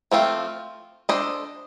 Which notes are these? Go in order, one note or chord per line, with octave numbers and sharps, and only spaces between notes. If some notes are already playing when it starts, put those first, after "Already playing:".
F3 A3 C4 F4
D4 A4 C5 D#5